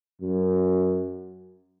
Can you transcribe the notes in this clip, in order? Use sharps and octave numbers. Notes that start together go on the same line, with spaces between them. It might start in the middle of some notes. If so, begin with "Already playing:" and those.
F#2